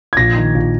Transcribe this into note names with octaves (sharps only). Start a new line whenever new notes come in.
G#6
A#1 A#6
D#3
A#1